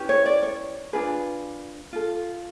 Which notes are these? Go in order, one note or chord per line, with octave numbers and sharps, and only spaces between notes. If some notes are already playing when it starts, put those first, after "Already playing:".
Already playing: C#4 E4 G4 B4
C#5
D5
C#5
D4 F4 G#4 B4
F4 A4